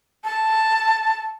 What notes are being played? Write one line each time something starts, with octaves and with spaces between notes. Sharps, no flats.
A5